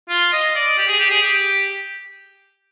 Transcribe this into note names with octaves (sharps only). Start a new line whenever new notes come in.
F4
D#5
D5
G4
G#4
G4
G#4
G4